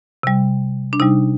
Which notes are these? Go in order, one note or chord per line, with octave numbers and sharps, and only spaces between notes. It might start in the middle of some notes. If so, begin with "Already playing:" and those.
C3 G3
D4
C3 G3 D#4